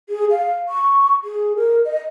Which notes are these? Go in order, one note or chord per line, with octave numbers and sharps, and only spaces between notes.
G#4
F5
C#6
G#4
A#4
D#5